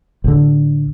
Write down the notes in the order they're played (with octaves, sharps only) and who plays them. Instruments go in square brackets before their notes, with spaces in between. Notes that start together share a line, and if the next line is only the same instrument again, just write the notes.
[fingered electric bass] A1 D3